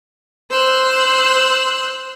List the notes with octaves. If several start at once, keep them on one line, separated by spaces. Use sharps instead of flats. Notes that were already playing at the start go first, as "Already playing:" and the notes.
C5 E6 F#6